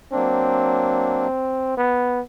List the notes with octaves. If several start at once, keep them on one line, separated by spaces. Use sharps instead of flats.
F#3 A#3 C4 D4
B3